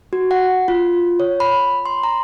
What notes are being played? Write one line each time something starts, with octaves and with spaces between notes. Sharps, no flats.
F#4
F#5
F4
C#5
B5
C6
A#5